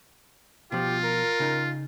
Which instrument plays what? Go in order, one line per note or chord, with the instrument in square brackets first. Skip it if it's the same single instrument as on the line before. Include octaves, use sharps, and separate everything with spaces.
[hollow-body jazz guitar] B2 F3 [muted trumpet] F4 [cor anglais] G4
[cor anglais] A#4
[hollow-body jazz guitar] C#3 D#4